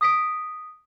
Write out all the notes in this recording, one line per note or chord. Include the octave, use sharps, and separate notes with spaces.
D#6 B6 D7